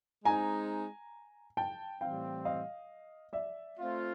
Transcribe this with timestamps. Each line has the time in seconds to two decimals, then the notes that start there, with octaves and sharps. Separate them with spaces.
0.25 G#3 C4 D#4 G#5 A#5
1.57 G5 A5
2.01 A2 E3 G3 C4 F5 G5
2.45 D#5 F5
3.33 D5 E5
3.76 A3 C4 F4